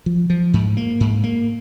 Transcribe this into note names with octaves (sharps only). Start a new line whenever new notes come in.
F3
F3
G#2
A#3
G#2
A#3